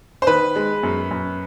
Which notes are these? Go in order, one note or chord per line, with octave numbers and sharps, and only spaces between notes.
C5
D#3 B4
G#3
F#2
F#2